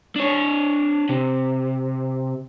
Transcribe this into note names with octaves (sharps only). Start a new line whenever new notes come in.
D4 C#5
C3